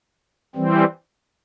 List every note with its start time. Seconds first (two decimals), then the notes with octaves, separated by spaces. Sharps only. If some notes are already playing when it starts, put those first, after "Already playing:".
0.55 E3 G3 C4